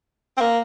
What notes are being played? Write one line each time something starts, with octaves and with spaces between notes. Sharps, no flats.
C4
A#3